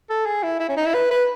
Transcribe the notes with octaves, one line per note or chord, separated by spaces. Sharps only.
A4
G#4
E4
E4
C#4
D#4
E4
B4
B4